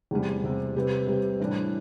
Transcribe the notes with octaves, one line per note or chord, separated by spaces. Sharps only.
E2 C3 G3
E2 C3 G3
C3 G3 C4 G4 B4
C3 G3 C4 G4 B4
A2 E3 G3 D4